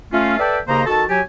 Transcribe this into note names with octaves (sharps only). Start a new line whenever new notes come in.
A3 C#4 F4
A4 B4 D5 E5 G5
D#2 C#3 A#3 C5 D#5 A#5
D#3 F#4 A4 A5
F#3 G4 G#5